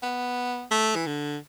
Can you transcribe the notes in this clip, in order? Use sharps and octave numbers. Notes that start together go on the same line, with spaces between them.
B3
A3
E3
D3